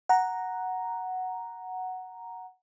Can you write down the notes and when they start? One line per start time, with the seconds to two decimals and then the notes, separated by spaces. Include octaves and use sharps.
0.09 F#5 A#5